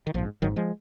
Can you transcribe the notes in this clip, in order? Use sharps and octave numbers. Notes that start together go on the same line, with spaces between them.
D#3
A#1 G#2 F3
G#1 G#2 D#3 F#3
F3 G#3